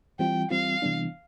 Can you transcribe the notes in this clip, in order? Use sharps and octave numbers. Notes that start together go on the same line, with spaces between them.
E3 G3 C4 F4 G5
E3 G3 C4 F4 F5
C3 E3 G3 B3 D4